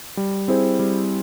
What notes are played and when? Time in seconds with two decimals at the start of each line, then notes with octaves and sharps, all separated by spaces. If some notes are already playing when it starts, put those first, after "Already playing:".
0.17 G3
0.48 C4 E4 G#4 C5
0.79 G3